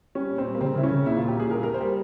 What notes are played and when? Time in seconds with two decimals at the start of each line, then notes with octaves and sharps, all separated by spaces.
0.15 G3 C#4
0.30 A#2
0.38 C4
0.46 G3
0.55 A#3
0.61 C#3 C4
0.75 C#3 E4
0.83 C#4
0.92 C#3
1.06 A#2 E4
1.17 A#2 F4
1.28 G4
1.36 A#2 G#4
1.51 G3 A#4
1.63 G3 A#4
1.74 C5
1.81 G3